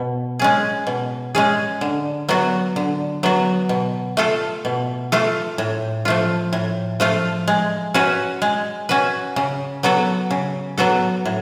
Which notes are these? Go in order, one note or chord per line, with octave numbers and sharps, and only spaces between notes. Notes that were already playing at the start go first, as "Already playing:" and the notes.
Already playing: B2
G#3 C#4 G#4
B2
G#3 C#4 G#4
D3
F#3 B3 F#4
D3
F#3 B3 F#4
B2
A3 F4 A4
B2
A3 F4 A4
A2
F3 A3 F4
A2
F3 A3 F4
G#3
C#4 F#4 B4
G#3
C#4 F#4 B4
C#3
F#3 B3 F#4 A4
C#3
F#3 B3 F#4 A4
A2